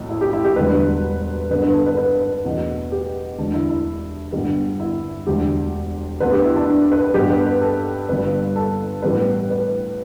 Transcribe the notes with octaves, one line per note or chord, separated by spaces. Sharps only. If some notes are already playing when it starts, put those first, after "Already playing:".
Already playing: B1 A2
E4
G4
E4
G4
E1 D2 D3 G3 B4
G2 D3 B3 B4
B4
A4
B4
B4
B4
E2 B2 A3
G4
E1 D2 D3 D4
E4
E4
G1 G2 D3 G3 B3
E4
E1 D2 D3 G4
D2 D3 B3 B4
G4
E4
D4
B4
G2 G3 B3 G4
B4
B4
A4
G1 G2 G3 B4
A4
A1 A2 E3 G3 B3 B4
B4